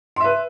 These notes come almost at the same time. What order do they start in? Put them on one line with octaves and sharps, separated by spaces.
C6 E5 B4